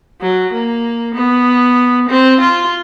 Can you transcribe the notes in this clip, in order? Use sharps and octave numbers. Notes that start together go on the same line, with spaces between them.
F#3
A#3
B3
C4
F4